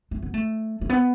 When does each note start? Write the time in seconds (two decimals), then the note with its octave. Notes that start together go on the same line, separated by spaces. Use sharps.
0.11 A3
0.22 B3
0.34 A3
0.81 A3
0.89 B3